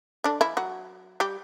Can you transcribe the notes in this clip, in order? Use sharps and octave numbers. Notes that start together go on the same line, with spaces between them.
D3 D4
E3 E4
F#3 F#4
G3 G4